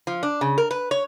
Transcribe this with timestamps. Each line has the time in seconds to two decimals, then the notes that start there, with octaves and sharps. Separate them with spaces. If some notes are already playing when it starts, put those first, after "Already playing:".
0.07 F3
0.23 D4
0.41 C#3
0.58 A#4
0.71 B4
0.91 C#5